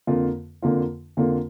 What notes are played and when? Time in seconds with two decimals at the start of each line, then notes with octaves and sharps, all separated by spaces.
0.07 F2 D3 A#3 F4
0.62 F2 D3 A#3 F4
1.17 F2 D3 A#3 F4